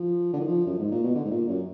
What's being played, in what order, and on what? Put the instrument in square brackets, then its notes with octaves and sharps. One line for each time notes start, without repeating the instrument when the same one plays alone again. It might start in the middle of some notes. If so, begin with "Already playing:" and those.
Already playing: [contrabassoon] F3
D3
D#3
F3
F#2
G#2
A#2
B2
D3
G#2
A#2
F#2